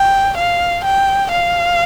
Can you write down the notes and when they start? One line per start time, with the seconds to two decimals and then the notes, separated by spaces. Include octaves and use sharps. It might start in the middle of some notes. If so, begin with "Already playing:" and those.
Already playing: G5
0.38 F5
0.85 G5
1.32 F5